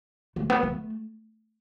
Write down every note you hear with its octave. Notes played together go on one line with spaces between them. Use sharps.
A3
B3
A3